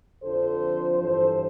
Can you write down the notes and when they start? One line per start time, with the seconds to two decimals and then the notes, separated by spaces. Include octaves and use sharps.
0.22 F2 D3 F3 A4 C5
0.98 G2 E3 A4 C5